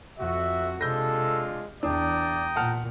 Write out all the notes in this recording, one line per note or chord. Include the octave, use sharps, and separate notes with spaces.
F2 F#4 E5
C3 G#3 D4 F4 A4 G6 A#6
E2 D4 D5 G5 A#5 D#6
A#2 F#5 A5 F6